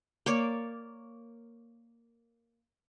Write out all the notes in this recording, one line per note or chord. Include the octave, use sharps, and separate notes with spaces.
A#3 C#5 D5